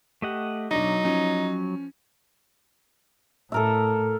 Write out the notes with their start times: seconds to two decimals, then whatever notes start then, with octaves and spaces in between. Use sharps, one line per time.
0.22 A3 G4 D#5 F#5
0.71 B1 F#3 D4 D#4 A#6
1.04 F3 C#4
3.52 A2 A4 A#4 E5